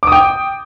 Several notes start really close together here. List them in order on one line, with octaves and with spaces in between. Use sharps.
D6 D#6 G5